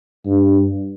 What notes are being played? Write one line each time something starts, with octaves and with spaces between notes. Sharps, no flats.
G2